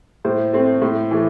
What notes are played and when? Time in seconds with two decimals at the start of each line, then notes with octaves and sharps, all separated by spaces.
0.25 A2 C5
0.53 A3 C4
0.82 A2
1.11 E3 A3